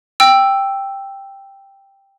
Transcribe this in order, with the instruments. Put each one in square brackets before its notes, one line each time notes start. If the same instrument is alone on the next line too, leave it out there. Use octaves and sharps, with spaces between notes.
[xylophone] G5 E6